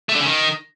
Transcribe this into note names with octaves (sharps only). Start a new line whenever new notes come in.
A3
D3
C#3
D#3